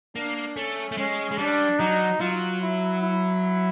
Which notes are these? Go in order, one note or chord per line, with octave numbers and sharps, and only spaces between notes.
A#3 D4
A3 C#4
A3
G#3 C#4
G#3
G3 D4
F#3 D#4
F#3 F4
E4
E4